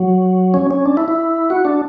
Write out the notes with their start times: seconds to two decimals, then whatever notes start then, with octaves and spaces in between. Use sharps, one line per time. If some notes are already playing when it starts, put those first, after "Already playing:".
Already playing: F#3
0.54 C#4
0.71 C#4
0.86 D4
0.97 E4
1.08 E4
1.50 F#4
1.65 D4